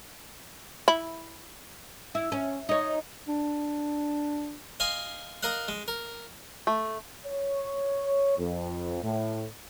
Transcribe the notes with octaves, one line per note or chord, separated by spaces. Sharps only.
E4
E4
C#4
D#4 C#5
D4
D#5 F5 G#5 C6
A#4 D#5 F5 F#5
G#3
A#4
A3
C#5
F2
A2